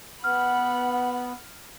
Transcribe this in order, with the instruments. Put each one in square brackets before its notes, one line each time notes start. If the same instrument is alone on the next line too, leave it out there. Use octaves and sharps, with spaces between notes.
[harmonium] B3 [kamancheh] F#5 B5 [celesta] F6